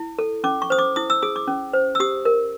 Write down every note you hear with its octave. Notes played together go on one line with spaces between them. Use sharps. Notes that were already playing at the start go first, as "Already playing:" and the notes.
Already playing: E4
A4
C#4 D6
C#6
C5 D#6
D6
E4 D#6
E6
G#4 D#6
D6
C#4
C5
E6
G4 D#6
A#4